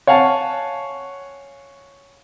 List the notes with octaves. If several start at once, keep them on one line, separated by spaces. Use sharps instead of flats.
C#5 F5 F#5 G#5 A5